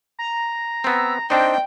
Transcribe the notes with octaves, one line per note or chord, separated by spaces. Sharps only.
A#5
B3 C4 E6
C4 D4 D#4 C5 D#5 G5